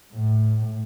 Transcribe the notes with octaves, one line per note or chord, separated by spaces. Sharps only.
A2